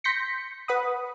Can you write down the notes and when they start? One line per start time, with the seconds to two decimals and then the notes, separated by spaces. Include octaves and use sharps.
0.04 C6 G6 A#6 B6 C#7
0.68 B4 F#5 B5 D#6